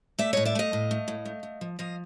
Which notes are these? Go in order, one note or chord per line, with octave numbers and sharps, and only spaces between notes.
A3 D5 E5
A2 C#5 D#5
D5 E5
A3 D#5 F5
A2
A3
A2
A3
A3
F3
F3 D#5 F5